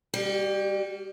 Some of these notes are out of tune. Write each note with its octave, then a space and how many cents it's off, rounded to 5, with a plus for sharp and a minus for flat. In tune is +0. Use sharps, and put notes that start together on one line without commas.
G3 +20 G4 -35